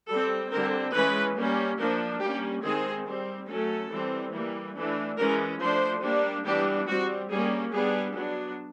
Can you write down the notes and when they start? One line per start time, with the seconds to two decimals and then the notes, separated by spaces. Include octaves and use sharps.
0.08 G3 C4 A4
0.51 D3 G3 C4 A#4
0.93 E3 G#3 C#4 B4
1.35 G3 A#3 C#4
1.78 F3 A#3 D4 A#4
2.20 G3 A#3 C#4 G4
2.63 D#3 G#3 C4 G#4
3.05 G3 C4
3.48 F#3 A3 C#4 A4
3.90 E3 G3 C4
4.33 E3 G3 A#3
4.75 E3 A3 D4
5.17 E3 G#3 C#4 A#4
5.60 F3 A3 D4 C5
6.03 G3 A#3 D4
6.45 E3 G3 B3 D4 G4
6.87 G3 C4 F#4
7.30 G3 A#3 C#4 G#4
7.72 G3 B3 D4 G#4
8.15 F#3 B3 D4